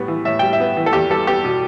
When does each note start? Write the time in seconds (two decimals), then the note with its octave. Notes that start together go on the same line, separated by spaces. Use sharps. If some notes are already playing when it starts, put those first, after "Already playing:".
Already playing: A2 G3 B3
0.08 E3
0.25 A2 E5
0.39 G3 G5
0.53 E5
0.60 B3
0.77 E3
0.86 A4
0.93 E2 G4
1.10 G3 A4
1.27 B3 G4
1.44 B2